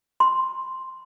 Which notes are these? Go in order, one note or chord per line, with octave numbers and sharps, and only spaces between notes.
C6